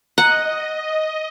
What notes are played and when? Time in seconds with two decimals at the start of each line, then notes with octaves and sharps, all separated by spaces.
0.18 D#5 F#5 A#5